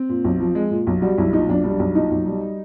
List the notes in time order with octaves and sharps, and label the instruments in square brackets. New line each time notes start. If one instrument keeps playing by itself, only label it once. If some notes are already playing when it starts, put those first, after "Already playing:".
Already playing: [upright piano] C4
A#2
B1
F3
G#3
A#2
B1
G3 F#4
B1 E4
A#2 D#4
B1 D4
G3 D4
B1
A#2 D#4
B1
G3